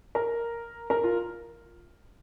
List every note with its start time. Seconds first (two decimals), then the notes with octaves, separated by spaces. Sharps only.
0.15 A#4
0.90 A#4
1.03 F4